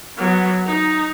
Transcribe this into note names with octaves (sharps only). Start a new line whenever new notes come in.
F#3 B3
D#4